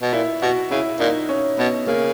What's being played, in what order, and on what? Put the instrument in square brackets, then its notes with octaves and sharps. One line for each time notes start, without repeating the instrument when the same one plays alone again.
[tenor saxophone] B2
[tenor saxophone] A#2 [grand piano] E4
[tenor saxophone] B2 [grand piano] F#4
[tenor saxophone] C#3 [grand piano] E4
[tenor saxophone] A#2 [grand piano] D#4
[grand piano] C#4
[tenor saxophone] B2 [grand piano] B3
[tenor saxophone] C#3 [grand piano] A#3